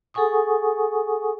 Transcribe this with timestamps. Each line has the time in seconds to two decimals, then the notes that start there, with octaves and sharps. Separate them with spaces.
0.14 G#4 A4 F#5 G#5 C#6 D#6